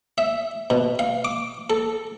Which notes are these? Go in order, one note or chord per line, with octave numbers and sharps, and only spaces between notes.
E5
B2
F5
D6
A4